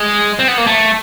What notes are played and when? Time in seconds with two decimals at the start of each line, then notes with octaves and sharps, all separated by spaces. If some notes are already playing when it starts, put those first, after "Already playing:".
Already playing: G#3
0.39 C4
0.48 B3
0.58 A#3
0.67 A3